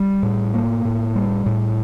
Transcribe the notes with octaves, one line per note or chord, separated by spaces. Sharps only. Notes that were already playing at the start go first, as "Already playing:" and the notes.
Already playing: G3
A2
A#3
A2
G3
A2